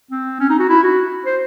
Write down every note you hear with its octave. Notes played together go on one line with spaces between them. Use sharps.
C4
C#4
D#4
F#4
E4
F#4
C5